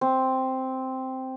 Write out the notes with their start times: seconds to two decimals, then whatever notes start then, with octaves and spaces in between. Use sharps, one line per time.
0.01 C4